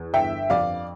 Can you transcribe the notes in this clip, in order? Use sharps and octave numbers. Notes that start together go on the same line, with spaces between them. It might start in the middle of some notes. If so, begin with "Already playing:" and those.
Already playing: E2
G1 E5 G5
F2 D5 F5